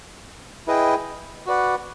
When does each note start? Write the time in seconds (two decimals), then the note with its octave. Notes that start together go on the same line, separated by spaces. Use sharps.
0.67 E4 G#4 B4 D#5 G5
1.47 F#4 B4 D5 F#5